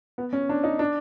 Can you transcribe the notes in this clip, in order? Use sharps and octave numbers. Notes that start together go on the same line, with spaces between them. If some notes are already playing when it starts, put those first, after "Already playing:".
B3
C#4
D4
D#4
D4